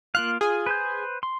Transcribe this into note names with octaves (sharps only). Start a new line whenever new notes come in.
A#3 F4 F5 F#6
F4 G#4 G#5
B4 C5 G6
C6